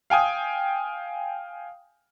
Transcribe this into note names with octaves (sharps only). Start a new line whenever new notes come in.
F5 G5 G#5 D#6